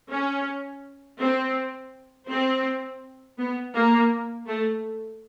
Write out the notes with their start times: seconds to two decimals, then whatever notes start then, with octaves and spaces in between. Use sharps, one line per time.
0.10 C#4
1.19 C4
2.29 C4
3.38 B3
3.75 A#3
4.47 A3